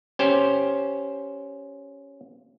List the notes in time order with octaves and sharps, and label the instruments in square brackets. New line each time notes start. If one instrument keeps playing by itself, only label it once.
[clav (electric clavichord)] C#4 G4 C5